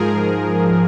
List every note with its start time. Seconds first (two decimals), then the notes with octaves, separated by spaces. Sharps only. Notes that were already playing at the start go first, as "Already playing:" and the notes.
Already playing: G#2 F3 G#4 A#4